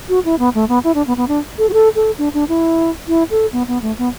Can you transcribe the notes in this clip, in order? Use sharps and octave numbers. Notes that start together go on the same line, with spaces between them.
F#4
E4
B3
A3
B3
E4
D4
B3
B3
D4
A4
F#4
A4
A4
D4
D4
E4
E4
A4
B3
B3
A3
B3